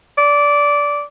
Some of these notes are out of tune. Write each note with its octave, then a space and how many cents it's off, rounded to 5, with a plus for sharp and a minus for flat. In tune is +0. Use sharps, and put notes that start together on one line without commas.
D5 -15